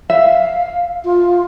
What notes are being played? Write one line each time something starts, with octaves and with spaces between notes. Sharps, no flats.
E5 F5
F4